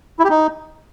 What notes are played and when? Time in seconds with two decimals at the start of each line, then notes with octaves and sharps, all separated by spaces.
0.19 E4
0.25 G4
0.30 D#4